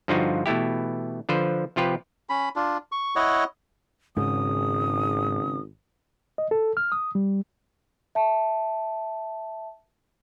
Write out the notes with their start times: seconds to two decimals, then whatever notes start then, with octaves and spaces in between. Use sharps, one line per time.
0.08 G2 D3 F3 D#4 F4 F#4
0.46 B2 E3 A3 E4 G4
1.29 D3 F3 B4 C5
1.76 C3 F3 F4 G4 B4
2.30 C#4 B5
2.56 D4 F4
2.92 C#6
3.16 E4 C#5 D#5 F#5
4.17 G#1 G#2 C#3 D#6
6.38 D#5
6.51 A4
6.77 F6
6.92 D#6
7.15 G3
8.15 E5 A5